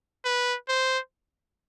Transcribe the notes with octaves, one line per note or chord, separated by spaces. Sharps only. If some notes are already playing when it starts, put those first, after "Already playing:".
B4
C5